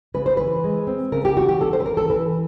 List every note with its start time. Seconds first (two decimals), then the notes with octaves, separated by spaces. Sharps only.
0.14 C#3 B4
0.26 C5
0.37 E3 B4
0.64 G#3
0.87 C4
1.12 C#3 A#4
1.25 G4
1.37 E3 F#4
1.48 G4
1.60 C#4 A4
1.73 C5
1.80 B4
1.85 E3 A#4
1.97 A4
2.10 E3 B4